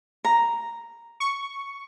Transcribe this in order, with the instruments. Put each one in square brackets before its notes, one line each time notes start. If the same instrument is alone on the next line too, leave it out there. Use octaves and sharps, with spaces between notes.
[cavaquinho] A#5
[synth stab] C#6